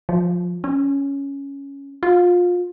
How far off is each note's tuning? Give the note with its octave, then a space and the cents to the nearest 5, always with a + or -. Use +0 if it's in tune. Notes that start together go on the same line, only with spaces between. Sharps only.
F3 +20
C#4 +5
F4 +25